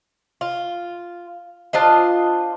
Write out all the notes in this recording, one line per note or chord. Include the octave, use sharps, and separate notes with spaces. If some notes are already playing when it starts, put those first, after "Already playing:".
F4
D4 F4 C5 D#5